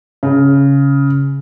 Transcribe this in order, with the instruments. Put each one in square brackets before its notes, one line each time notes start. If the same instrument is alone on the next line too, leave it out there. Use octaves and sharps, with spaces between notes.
[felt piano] C#3